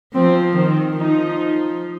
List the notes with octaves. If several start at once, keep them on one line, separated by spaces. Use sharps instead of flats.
F3 C4
D#3 C4
F3 D#4